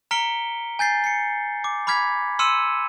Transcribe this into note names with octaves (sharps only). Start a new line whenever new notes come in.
A#5 F6 B6 C#7 D7 G7
G#5 G6 A6 C7
C7 C#7
D6
B5 D6 F6 G#6 B6
C6 E6 F6 C#7 D#7 E7